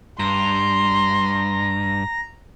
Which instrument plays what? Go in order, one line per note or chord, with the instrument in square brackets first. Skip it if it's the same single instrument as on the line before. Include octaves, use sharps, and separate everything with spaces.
[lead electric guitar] G2 [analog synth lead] A#5 [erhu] C6